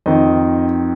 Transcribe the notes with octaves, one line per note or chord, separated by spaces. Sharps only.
F2 D#3 D#5